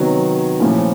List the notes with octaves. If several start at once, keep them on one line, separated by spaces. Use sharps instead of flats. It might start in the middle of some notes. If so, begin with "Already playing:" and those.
Already playing: C3 D#3 F#3 B3
A#2 F3 A3 C#4 E4